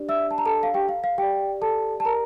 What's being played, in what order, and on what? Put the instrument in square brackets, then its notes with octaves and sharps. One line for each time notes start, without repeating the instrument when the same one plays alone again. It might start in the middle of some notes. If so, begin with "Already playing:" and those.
Already playing: [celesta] D4 G4 D5
E5 E6
A5
A#5
A4 A5
F5
G4 G5
F5
F5
G4 D5 G5
A4 A5
A5
A#4 A#5